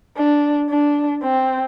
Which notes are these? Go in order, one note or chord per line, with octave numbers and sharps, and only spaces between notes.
D4
D4
C4